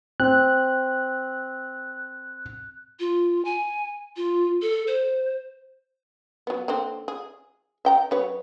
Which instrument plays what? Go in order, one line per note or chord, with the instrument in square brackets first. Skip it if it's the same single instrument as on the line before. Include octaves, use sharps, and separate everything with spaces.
[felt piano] C4 [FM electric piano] F#6
[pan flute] F4
G#5
F4
A4
C5
[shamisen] F#3 B3
D3 A#3 C4
G#4
E5 G5 A#5
F#3 B4 C#5